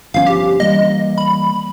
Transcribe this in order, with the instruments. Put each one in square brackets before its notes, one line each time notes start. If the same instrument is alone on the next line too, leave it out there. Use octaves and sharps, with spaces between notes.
[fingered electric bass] G1 F3 C#4 [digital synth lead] F5
[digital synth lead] G4
[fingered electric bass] E3 G3 A#3 [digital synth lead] D#5
[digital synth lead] B5